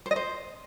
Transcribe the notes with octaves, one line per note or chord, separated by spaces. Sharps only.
C5
D#5
C5